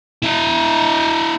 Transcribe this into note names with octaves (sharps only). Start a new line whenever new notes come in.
E4 D#5